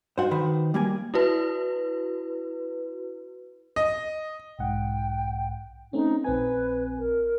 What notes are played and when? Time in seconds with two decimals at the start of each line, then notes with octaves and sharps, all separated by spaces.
0.18 D#4 F#4 C5 F#5
0.31 D#3 B4 C5
0.74 G3 A#3 G#5
1.14 E4 F#4 B4
3.76 D#5
4.59 B1 G#2 F#5 G5
5.93 A3 C4 C#4 D#4
6.24 A#1 C4 B4 G#5
6.99 A#4